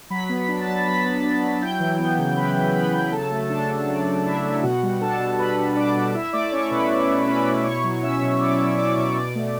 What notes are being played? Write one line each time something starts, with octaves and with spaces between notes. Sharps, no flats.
F#3 B5 B6
B3
D4
A5 A6
F#3
F#3 B5 B6
B3
D4
F#3
E4 G5 G6
E3
B3
C#3
E4 B4 B5
E3
B3 B4 B5
C#3
F#3 A4 A5
A3
D4 A4 A5
F#3
F#3 D5
A3
D4 E4 E5
F#3
B2 F#4 F#5
G3
D4 A4 A5
B2
B2 B4 B5
G3
D4 D5 D6
B2
E4 E5 E6
A3 D5 D6
C#4 C#5 C#6
B2 B4 B5
E4
A3
C#4 B4 B5
B2
E4 C#5 C#6
F#3
C#4 E5 E6
B2
E4 D5 D6
F#3 E5 E6
C#4 D5 D6
B2 D5 D6
B2 D5 D6
A3